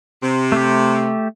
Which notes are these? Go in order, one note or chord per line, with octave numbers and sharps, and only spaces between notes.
C3
A3 G4